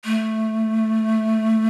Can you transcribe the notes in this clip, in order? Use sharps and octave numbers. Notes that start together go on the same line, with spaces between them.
A3